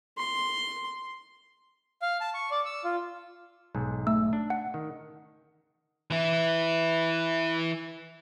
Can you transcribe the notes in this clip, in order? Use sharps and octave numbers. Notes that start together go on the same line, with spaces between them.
C6
F5
A5
C#6
D5
E6
F4
B1 G#2
A3 E6
D4
F#5
D#3
E3 E4